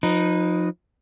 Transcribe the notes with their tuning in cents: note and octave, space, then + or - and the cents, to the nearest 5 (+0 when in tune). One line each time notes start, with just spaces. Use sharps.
F3 +30 D#4 -10 B4 +0